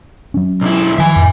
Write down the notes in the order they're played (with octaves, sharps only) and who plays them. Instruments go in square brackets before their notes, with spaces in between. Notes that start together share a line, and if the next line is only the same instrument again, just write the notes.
[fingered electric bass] F#3 C#4
[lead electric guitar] B1 E4
[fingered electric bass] D#3 F3 F#3 [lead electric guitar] E5 G#5
[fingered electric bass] F2 A2